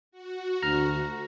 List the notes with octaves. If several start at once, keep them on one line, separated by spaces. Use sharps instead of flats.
F#4
D2 A#5 F6